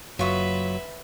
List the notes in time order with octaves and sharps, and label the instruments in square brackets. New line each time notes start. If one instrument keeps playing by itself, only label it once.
[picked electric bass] F#1 [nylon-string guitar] F#3 [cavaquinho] F4 C#6 D#6 [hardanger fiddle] B4 E5